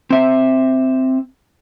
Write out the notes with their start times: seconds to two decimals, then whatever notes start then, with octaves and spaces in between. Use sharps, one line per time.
0.10 C4 E5